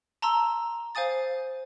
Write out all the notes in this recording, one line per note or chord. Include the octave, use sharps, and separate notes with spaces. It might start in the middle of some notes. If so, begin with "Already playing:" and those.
A5 A#5 C6 E6
C5 F5 G#5 D#6 A6